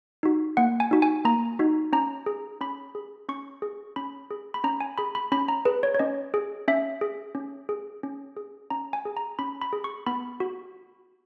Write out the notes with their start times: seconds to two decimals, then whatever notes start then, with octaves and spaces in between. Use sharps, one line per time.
0.23 D#4 F#4
0.57 A#3 F#5
0.80 G#5
0.91 D#4 F#4
1.02 G#5
1.25 A#3 A#5
1.59 D#4 F#4
1.93 C#4 A#5
2.26 G#4
2.61 C#4 B5
2.95 G#4
3.29 C#4 C#6
3.62 G#4
3.96 C#4 B5
4.31 G#4
4.54 B5
4.64 C#4 A#5
4.80 G#5
4.98 G#4 B5
5.15 B5
5.32 C#4 B5
5.48 A#5
5.65 G#4 B4
5.83 C#5
5.95 C#5
5.99 C#4 D#5
6.34 G#4
6.68 C#4 E5
7.01 G#4
7.35 C#4
7.69 G#4
8.03 C#4
8.37 G#4
8.70 C#4 A#5
8.93 G#5
9.05 G#4
9.17 A#5
9.39 C#4 B5
9.62 B5
9.73 G#4
9.84 C#6
10.07 B3 B5
10.40 F#4